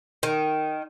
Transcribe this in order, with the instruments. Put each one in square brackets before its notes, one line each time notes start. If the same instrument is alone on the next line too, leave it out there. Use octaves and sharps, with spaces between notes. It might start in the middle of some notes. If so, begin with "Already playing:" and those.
[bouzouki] D#3